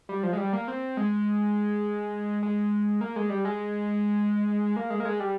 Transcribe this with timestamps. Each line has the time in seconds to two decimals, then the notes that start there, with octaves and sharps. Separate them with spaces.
0.09 G3
0.23 F3
0.33 G#3
0.37 G3
0.53 A#3
0.68 C4
0.97 G#3
2.43 G#3
3.01 A#3
3.16 G#3
3.29 G3
3.45 G#3
4.76 A#3
4.90 G#3
5.00 A#3
5.05 G#3
5.20 G3